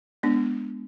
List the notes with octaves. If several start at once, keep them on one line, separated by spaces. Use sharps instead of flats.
G#3 B3 D4